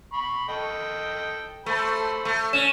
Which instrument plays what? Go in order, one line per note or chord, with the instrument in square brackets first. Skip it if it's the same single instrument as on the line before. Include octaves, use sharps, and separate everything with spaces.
[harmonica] B5 C#6
A4 D#5 G5
[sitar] A3 [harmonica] A4 C5 B5
[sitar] A3
[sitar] C#4 [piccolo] E7